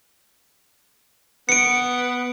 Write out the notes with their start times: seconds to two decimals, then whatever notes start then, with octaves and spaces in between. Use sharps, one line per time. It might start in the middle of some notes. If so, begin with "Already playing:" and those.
1.49 B3 C#7 D7